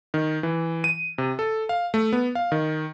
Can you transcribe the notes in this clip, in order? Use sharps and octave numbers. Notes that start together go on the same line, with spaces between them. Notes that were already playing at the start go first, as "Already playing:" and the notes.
D#3
E3
D#7
C3
A4
F5
A3
B3
F5
D#3